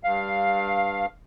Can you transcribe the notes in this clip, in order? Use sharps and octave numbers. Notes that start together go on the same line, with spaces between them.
G2 F5